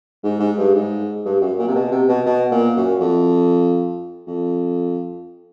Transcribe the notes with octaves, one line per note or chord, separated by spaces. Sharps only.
G#2
G#2
G2
G#2
G2
F#2
A#2
C3
B2
C3
B2
B2
A#2
F#2
F2
F2